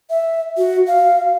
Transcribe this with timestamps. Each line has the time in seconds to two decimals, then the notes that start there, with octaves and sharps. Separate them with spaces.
0.10 E5
0.58 F#4
0.87 F5